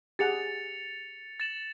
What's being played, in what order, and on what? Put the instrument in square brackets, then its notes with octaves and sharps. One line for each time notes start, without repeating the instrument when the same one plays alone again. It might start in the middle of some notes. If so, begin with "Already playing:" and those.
[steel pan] G4 G#4 F#5 [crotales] A6 C#7 F7
[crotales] A6 E7 F#7